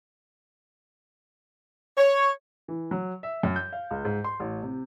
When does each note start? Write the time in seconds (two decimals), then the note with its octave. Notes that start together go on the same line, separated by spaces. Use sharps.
1.98 C#5
2.68 E3
2.91 F#3
3.23 E5
3.43 F#2
3.56 G6
3.73 F5
3.91 C#2
4.05 G#2
4.24 C6
4.40 A1
4.63 C3